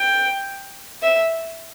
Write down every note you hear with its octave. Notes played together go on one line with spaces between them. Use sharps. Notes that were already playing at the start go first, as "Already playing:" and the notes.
Already playing: G5
E5